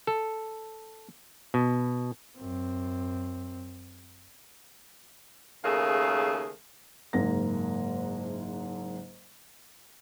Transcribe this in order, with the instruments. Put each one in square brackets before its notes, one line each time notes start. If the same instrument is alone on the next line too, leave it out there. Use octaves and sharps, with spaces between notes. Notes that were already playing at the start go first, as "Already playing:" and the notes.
[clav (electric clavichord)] A4
B2
[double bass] F#2 C4
[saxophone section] D#2 C#3 A3 G#4 A#4 F5
[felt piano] F#1 G#2 A#3 A#6